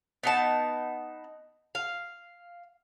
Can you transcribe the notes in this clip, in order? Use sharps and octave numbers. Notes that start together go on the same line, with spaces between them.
B3 D#4 A5
F5